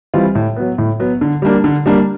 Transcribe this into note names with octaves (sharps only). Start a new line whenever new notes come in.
E3 G3 C4 F4
A2
F#3 B3
A2
F#3 B3
D3
G3 A#3 D4
D3
G3 A#3 D4